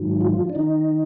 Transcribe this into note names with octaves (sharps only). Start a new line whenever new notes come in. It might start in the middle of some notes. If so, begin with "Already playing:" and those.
Already playing: G#2 D#3 F#3
F3 F4
D4
D#3 D#4